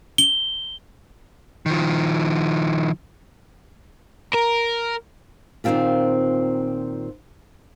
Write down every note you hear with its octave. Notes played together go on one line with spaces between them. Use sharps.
G7
D#3 F3
A#4
A#2 D#3 A#3 C4 F4 G4